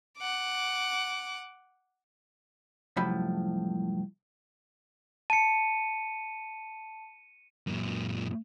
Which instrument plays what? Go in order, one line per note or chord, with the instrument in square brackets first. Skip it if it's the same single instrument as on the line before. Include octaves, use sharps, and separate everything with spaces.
[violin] F#5 D6
[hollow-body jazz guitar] C2 F#2 A2 F3 B5
[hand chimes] A5 [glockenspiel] C#7 D#7
[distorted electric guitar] F#2 A#2